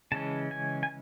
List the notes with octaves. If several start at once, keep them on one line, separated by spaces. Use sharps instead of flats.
C#3 E3 G#3 C#4 A5
G#5
G#5